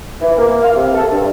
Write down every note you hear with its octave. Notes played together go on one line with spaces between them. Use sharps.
E3
A#3
F5
C3
A4
G2